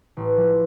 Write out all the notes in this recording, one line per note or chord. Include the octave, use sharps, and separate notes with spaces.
A1
F3